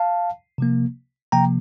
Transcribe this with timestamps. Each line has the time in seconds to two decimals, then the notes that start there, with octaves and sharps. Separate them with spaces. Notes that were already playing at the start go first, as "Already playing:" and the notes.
Already playing: F5 A5
0.58 C3 F3 A#3
1.32 C3 F3 A#3 G5 A#5